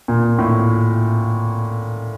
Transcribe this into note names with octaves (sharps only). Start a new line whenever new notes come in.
A#2
A2